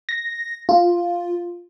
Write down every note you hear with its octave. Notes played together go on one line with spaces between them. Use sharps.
A#6
F4